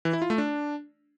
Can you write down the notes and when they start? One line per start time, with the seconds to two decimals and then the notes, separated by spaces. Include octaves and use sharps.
0.05 E3
0.13 E4
0.22 F4
0.30 A3
0.38 D4